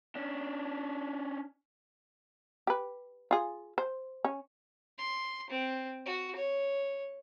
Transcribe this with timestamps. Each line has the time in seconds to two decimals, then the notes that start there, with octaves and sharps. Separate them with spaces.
0.15 C#4 D4
2.67 G4 B4
3.31 F4 G#4
3.78 C5
4.25 C#4
4.99 C6
5.50 C4
6.06 F#4
6.36 C#5